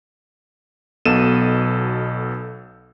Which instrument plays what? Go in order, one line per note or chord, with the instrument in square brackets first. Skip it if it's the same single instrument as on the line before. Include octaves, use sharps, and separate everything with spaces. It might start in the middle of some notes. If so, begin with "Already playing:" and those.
[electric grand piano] B1 B2 A4 D#7 E7